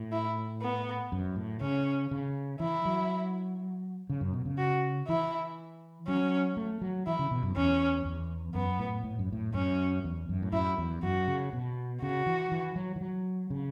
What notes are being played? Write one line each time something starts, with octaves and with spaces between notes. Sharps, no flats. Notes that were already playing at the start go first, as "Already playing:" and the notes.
Already playing: A2
E4
B3
F#2
A2
C#3 C#4
C#3
E3 E4
F#3
C#3
F#2
B2
C#3
F#4
E3 E4
F#3 C#4
A3
F#3
E3 E4
C#3
B2
F#2
E2 C#4
E2
F#2 B3
A2
A2
F#2
A2
F#2 C#4
E2
F#2
A2
F#2 E4
E2
F#2 F#4
C#3
B2
C#3 F#4
E3
E3
F#3
E3
F#3
C#3